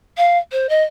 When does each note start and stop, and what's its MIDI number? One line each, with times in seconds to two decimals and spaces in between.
0.17 0.38 77
0.52 0.69 72
0.69 0.82 75